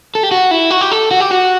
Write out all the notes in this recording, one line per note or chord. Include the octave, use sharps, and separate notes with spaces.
A4
G4
F#4
E4
F#4
G4
A4
F#4
G4
F#4